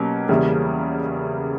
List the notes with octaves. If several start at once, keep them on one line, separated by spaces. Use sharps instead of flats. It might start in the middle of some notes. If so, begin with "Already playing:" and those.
Already playing: B2 F#3 A#3 C#4 G4
E2 C#3 G3 A#3 E4